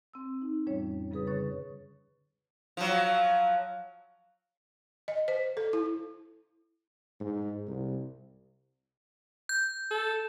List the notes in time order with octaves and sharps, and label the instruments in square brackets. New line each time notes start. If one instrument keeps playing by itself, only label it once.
[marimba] C4 E6
D#4
F2 A2 E3 G3 C#4 C#5
F#2 C#3 G3 G#4 B4 D#6
D3 C#5 C#6 A6
[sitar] F3 F#3
[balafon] D#5
C5
A4
E4
[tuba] G#2
C2
[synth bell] G6
[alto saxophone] A4